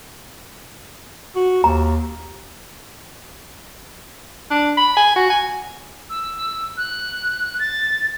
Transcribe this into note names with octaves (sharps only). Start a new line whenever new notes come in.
F#4
D#2 A#5
D4
B5
G#5
F#4
G#5
E6
F#6
A6